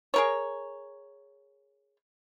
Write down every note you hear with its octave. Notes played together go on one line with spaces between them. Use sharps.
G#4 A#4 C#5